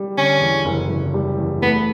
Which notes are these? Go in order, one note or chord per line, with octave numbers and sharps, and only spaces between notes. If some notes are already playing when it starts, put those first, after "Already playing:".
Already playing: G3
D3 C#4
E2
F#1
F#1
G3
E2
A3 B3